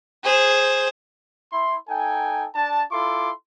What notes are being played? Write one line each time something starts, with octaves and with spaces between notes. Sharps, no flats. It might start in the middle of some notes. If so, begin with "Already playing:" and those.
G#4 C5
E4 C6
D#4 A4 G5 G#5
D4 A5
E4 F4 A4 C6 D6